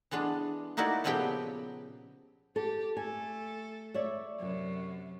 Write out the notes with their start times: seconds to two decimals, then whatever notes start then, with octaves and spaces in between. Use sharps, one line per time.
0.11 E3 G#3 B3 D4
0.77 A#3 D#4 E4 F#4 D5
1.04 A#2 C#3 F3 B3 G4 G5
2.56 G4 A4
2.97 A3 A4 G#5
3.94 C#5 D5 E5
4.39 F#2 C3 F#3